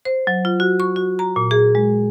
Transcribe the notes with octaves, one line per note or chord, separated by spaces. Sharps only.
C5
F#3
F4
F#4
C#6
F#4
A#5
A#2
G#4
G#3